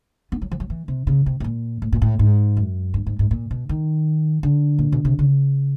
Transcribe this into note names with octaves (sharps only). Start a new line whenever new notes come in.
B3
F#3
F3
F#3
E3
C3
C#3
C3
A2
A#2
A2
A#2
A2
G#2
F#2
G2
G#2
G#2
A#2
B2
D#3
D3
A#2
B2
C3
C#3